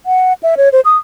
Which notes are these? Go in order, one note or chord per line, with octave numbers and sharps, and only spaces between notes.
F#5
E5
C#5
C5
D#6